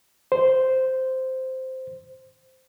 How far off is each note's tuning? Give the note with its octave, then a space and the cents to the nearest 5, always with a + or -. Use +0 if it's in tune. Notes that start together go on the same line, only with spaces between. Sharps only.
C5 -5